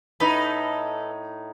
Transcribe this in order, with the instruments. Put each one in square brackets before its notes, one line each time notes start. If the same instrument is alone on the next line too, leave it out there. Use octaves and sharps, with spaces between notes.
[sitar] A2 D#4 [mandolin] A4 B4 B5